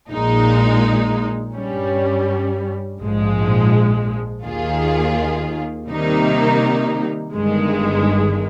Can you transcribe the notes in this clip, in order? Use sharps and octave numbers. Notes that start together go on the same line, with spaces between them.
A#1 A#2 G#3 D#4
G2 G3 C#4
A#1 G#2 F3 G#3
D#2 D#3 A#3 F4 G#4
C3 D#3 G3 A#3 D#4
G1 G2 D#3 G#3